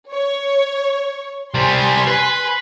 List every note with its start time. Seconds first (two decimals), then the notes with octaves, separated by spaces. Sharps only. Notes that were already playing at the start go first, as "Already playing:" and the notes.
0.12 C#5
1.55 C3 G3 G#5 C6
2.07 B4